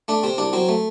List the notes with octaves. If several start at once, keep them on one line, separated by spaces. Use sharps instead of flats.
A3 D4
C3 C4
C2 D4
F#3 C4
A3